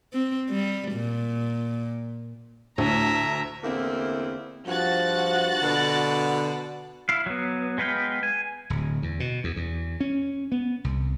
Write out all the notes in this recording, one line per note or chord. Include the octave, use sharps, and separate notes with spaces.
C4
G3
A#2
D2 A2 E5 A#5
E2 D3 A#3 C4 E4
G2 F3 F#4 F#6 A6
B2 D3
E4 F5
F#3 B3
G#3 B3 B4 F5 G5
G#5
D1
E2
B2
E2
E2
C#4
B3
C2